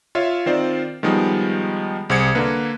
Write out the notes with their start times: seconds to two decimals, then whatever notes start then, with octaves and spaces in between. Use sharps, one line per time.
0.15 F4 C#5 E5 F5
0.46 D#3 C4 F4 C5 D5
1.03 D#3 F3 G3 G#3 B3
2.10 C2 G#4 C5 G#6 C#7
2.35 D3 A#3 B4